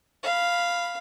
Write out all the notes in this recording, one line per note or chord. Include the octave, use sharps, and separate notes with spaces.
F5 B5